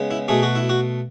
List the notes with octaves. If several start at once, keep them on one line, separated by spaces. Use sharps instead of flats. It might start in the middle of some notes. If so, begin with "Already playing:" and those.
Already playing: C#3 G#3 B3
E4
B2 A3 G#4
F#4
E4
F#4